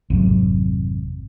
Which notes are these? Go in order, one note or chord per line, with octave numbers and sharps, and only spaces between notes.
G#1 F2 C3 F#3